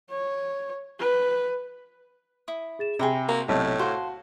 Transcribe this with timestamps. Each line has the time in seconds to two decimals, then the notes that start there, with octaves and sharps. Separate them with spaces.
0.10 C#5
0.99 B4
2.48 E4 D#6
2.79 G#4 A6 E7
2.99 C3 G#4 G5 A#5 B5
3.28 A#3 F#4
3.49 B1 A2 C3 C#5 D#5 A5
3.79 F#4 C5 F5 A5